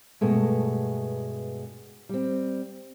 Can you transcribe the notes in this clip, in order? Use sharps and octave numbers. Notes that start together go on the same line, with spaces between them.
G2 B2 G#3 A3
G3 C4